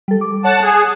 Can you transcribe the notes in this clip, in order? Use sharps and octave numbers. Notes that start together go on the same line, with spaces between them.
G3 A4
D6
C#5 F#5 A5
G#4 F#6